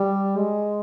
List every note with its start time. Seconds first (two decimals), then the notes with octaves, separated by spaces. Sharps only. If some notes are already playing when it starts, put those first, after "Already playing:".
Already playing: G3
0.37 G#3